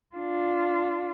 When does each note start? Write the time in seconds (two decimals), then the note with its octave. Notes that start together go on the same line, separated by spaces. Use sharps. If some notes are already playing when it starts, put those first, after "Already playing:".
0.16 D4 F4